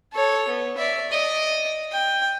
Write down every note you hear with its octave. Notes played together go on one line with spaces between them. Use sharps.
A4 C#5
B3
D5 E5
D5 D#5
G5